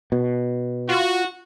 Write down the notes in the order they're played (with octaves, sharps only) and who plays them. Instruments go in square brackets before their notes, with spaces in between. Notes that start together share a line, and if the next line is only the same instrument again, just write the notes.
[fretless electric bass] B2
[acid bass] F4 [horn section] F#4